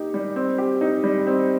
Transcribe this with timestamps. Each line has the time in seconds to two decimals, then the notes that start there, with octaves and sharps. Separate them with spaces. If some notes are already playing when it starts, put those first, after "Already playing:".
Already playing: A#3 D#4 G4
0.14 G3
0.36 C4
0.58 G4
0.81 D#4
1.04 G3
1.27 C4